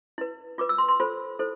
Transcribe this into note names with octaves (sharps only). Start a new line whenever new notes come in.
E4 B4
F4 B4 D6
E6
C6
C6
F4 A4 C5 B5
E4 A4 C5